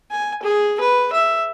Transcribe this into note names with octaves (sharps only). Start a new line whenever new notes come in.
G#5
G#4
B4
E5